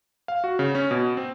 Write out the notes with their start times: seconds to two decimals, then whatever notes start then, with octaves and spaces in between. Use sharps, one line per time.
0.28 F5
0.44 F#4
0.59 C#3
0.75 C#4
0.91 B2
1.17 C4